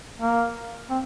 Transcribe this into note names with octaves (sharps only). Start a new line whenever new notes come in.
A#3
C4